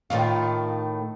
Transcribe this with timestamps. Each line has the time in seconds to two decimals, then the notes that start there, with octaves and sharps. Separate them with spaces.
0.10 A2 D#3 F4